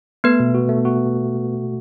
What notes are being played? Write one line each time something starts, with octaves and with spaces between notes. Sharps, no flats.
A3 B3 B4
B2
F#4
A3
F#4